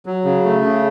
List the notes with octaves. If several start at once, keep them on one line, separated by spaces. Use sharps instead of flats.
F#3
C#3
A3
C#3